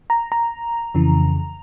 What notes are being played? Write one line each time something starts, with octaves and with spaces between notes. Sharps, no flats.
A#5
A#5
F2 C#3 E3